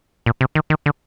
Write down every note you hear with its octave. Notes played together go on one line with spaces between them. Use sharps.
A#2
C3
D#3
D#3
D3